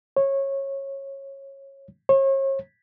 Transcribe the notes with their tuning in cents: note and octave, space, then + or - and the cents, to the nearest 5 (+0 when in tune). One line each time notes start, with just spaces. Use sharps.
C#5 -20
C#5 -40